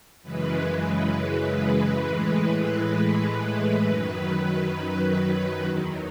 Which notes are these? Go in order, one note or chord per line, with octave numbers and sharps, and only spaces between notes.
F#2 C#3 E3 G#3 B4
B4
B4
A2 E3 G#3
B4
F#2 D#3 F#3
E2 D#3 F#3